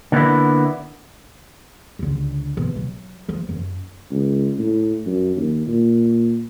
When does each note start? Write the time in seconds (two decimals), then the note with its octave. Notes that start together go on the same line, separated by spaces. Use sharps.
0.12 D3 A#3 B3 C#4 D4 E4
1.99 C#2 D3
2.57 C2 B2
2.76 F#3
3.28 F3 B3
3.49 F#2
4.11 C#2
4.59 A2
5.06 F#2
5.36 D#2
5.67 A#2